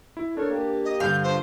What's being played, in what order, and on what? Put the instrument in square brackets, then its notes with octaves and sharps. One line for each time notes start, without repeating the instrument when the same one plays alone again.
[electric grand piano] E4
[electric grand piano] D4 [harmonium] A4 A#4 C#5
[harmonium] A#3 G4
[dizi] D#5
[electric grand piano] G2 D3 [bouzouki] F5 [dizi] G6
[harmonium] D4 F4 [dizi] C5